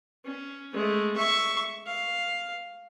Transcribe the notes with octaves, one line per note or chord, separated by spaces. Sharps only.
C#4
G#3 A3
E5 C#6
F5